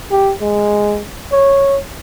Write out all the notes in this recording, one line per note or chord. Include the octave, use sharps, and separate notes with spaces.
G4
G#3
C#5